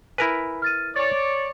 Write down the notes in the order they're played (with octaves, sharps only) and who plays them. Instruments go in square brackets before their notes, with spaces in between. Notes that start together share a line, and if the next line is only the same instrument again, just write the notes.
[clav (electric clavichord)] E4 A#4 B4 [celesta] G#5 B5
[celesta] F6 A6 D#7
[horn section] C#5 D5 [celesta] A6